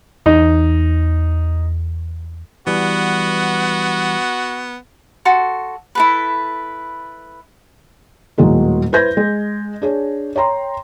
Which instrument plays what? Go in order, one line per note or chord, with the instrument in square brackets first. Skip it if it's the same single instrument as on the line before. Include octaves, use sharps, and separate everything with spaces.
[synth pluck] E2 [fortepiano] D#4
[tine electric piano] E3 G3 [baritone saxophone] B3 [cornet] F#4
[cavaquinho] F#4 A4 C6
E4 A4 B4
[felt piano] D#1 A2 D#3 F#3 G#3 A#3
E4 B4 C5 G6 G#6 A#6
G#3
D4 G#4 C#5
C#5 G5 A#5 C6